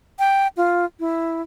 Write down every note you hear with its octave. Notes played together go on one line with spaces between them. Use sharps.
G5
F4
E4